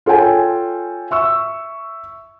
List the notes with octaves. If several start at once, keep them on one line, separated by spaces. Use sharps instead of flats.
F4 A4 C#5 G5 G#5
E5 C#6 E6